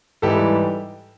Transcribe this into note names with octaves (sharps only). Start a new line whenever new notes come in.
G#2 E3 G3 G4 A4